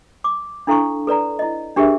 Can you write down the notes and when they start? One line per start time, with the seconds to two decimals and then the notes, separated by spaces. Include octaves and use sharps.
0.24 D6
0.67 D4 E4 A4 F5 A#5 C#6
1.07 A4 B4 D5 A#5
1.39 E4 D#5
1.76 D4 G4 G#4 A#4 B4 E5